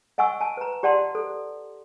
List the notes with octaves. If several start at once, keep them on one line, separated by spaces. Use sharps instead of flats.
D#5 F#5 G#5 C#6 E6
G#5 A5
B4 A#5
G4 D5 F#5 A5 C6
A4